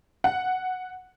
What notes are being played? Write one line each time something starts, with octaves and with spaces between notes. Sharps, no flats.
F#5